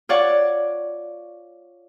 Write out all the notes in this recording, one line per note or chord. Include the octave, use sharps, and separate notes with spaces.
F4 C#5 D5 F#5